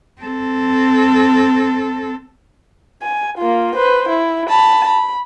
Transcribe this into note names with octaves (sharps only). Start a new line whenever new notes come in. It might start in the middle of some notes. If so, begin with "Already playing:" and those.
C4 A4
G#5
A#3 F4
B4 C5
E4
A5 B5
B5